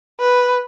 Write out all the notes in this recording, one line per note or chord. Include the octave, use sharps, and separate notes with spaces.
B4